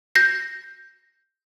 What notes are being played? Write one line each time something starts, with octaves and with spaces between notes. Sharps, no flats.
G6 A#6 C7